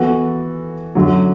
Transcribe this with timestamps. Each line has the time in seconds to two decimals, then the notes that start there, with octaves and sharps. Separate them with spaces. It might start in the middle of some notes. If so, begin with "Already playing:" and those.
Already playing: E3 B3 F#4 A4
0.95 F#2 D3 F#3